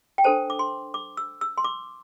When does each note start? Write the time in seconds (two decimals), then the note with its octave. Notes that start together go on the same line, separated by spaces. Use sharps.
0.18 G5
0.24 D4 A4 C5 A5
0.50 D6
0.59 C6
0.94 D6
1.17 E6
1.41 E6
1.58 C6
1.64 D6